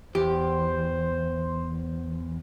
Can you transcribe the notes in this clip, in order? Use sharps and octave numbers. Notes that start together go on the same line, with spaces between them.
E2 G4 C5